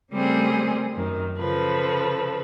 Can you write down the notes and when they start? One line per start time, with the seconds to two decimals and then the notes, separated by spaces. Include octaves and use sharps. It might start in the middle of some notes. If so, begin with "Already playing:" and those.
0.12 C#3 G3 A3 C4 G#4 A#4
0.94 F#2 D#3
1.39 C#3 F3 A4 B4